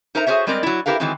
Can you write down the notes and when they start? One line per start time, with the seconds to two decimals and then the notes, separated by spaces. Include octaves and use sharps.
0.15 D#4 A#4 C5 E5 A#5
0.27 F#4 G#4 A#4 C5 C#5 E5
0.47 G3 G#3 C4 A#4 D5 D#5
0.63 F#3 E4
0.86 E4 F#4 G4 A#4 B4 F5
1.00 D#3 E3 F#3 G#3 C4